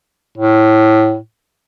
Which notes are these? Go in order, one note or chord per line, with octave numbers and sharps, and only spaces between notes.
A2